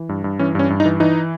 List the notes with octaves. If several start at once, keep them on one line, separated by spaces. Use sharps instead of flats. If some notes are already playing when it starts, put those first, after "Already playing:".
Already playing: E3
G2
G2
E3 C#4
G2 C#4
G2
D#4
E3
E3 D#4